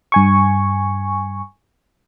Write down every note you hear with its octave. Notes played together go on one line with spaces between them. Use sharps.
G2 G#5 C#6